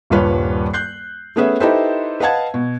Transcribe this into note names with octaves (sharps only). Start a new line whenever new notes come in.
D#1 G2 F4 B4 C#5
F#6 G6 C7
A3 B3 C#4 G#4 B4 E5
D#4 E4 G4 A4 B4 C5
B4 D#5 F5 F#5 A5 G#6
B2